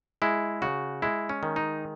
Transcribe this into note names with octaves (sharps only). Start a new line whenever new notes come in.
G#3 E4
C#3 F#4
G#3 E4
C#4
D#3
D#4